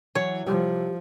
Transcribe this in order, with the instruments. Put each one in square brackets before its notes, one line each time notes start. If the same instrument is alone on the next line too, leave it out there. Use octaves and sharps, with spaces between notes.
[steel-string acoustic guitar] E3 F#3 [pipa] C#5
[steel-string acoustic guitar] C3 [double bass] F3 [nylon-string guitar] G3